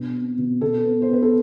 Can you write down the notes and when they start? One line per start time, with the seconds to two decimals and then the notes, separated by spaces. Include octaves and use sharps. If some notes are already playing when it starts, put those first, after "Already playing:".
Already playing: B2 D4
0.13 C4
0.38 B2
0.61 B2 A4
0.85 B3
1.02 C5
1.09 B3 B4
1.22 A4